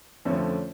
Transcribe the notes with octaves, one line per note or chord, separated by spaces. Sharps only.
F2 D3 F3 A3 C#4